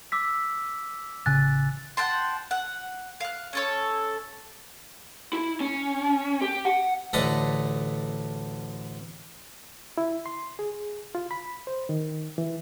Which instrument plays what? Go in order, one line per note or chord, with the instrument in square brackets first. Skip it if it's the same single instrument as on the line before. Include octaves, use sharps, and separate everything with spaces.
[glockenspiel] D6 E6 B6
[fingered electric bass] A1 C#3 C#4 [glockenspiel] G#5 F#6 A6
[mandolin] F#5 G5 A5 C6
F#5
F5 F#6
C#4 A4 C#5
[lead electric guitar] E4
C#4
G4
F#5
[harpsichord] A1 D2 D3 A4 D#5 B5
[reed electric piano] E4
C6
G#4
F4
B5
C5
D#3
E3